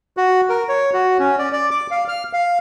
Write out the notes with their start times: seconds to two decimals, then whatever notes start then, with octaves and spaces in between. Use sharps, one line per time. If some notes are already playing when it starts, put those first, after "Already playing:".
0.17 F#4
0.49 A#4
0.69 C#5
0.93 F#4
1.19 C#4
1.39 D5
1.53 D5
1.71 D6
1.91 F5
2.08 F6
2.33 F5